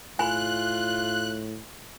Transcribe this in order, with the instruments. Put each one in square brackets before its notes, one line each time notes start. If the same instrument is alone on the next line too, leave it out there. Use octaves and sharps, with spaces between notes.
[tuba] A2 [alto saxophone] F4 [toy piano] G#5 B5 [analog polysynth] F#6